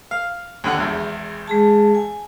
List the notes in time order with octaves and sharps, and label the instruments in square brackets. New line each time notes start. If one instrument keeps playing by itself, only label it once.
[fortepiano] F5
D#2 D3 F#5
G#1 E2
[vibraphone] G#3 G#4 A5
G#5